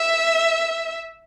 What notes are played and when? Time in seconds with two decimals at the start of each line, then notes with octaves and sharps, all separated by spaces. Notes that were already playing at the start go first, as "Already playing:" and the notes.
Already playing: E5